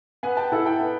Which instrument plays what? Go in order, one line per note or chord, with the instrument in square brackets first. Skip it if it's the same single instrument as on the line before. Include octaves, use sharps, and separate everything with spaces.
[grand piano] B3 [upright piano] F#5 G#5
[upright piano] G5 A5
[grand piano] E4 A4 [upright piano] F#5 G#5
[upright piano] G5 A5
[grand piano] B3